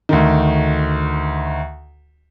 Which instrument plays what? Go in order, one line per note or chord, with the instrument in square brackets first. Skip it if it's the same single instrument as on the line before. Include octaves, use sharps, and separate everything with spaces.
[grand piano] D2 D#3